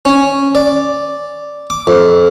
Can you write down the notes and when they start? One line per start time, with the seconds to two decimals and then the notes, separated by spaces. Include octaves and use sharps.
0.05 C#4
0.55 D5
1.70 D6
1.87 F2